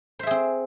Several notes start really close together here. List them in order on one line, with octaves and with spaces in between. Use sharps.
C5 E5 G#4 C4